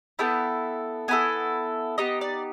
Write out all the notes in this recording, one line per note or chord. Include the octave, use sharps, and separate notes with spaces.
B3 E4 A4 G5
B3 E4 A4 G#5
B3 D#4 G4 D#5
D5